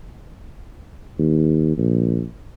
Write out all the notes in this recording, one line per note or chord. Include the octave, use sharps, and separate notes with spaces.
D#2
A#1